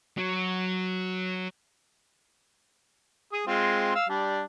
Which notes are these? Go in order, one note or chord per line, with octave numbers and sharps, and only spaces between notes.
F#3
G#4 D#6
G#3 C4 F4
F5 E6
G3 D4